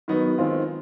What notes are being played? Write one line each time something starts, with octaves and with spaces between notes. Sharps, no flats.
D#3 F#3 B3 D#4
D#3 G#3 C4 F4